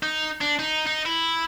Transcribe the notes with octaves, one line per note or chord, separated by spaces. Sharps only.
D#4
D4
D#4
D#4
E4